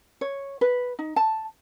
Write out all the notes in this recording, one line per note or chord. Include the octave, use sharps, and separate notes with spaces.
C#5
B4
D#4
A5